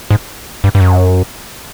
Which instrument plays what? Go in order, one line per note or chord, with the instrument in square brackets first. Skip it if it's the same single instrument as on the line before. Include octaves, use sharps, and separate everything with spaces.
[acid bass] G#2
G2
G2
F#2